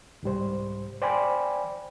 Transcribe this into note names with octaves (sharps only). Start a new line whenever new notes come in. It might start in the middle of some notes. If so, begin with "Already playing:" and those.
C2 G#2 G3 C5
C5 D5 G5 G#5 B5